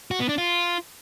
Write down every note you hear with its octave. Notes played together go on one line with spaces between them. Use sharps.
F#4
B3
D4
F4